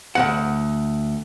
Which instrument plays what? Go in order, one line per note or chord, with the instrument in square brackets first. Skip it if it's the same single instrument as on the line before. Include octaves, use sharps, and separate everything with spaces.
[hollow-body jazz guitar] D2 C3 F#5